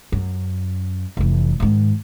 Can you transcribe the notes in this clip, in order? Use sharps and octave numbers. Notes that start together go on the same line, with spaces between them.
F#2
F1 E3
G#2 D#3